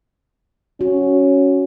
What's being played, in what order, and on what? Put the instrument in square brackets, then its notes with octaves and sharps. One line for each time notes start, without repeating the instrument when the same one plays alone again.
[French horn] C#4 [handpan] F#4